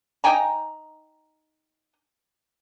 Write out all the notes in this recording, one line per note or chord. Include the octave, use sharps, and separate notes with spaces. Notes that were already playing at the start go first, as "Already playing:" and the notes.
D#4 G5 G#5 A#5